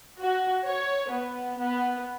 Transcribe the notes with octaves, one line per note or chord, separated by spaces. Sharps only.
F#4
C#5
B3
B3